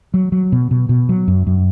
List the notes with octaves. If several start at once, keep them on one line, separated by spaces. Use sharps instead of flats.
F#3
F#3
B2
B2
B2
F#3
F#2
F#2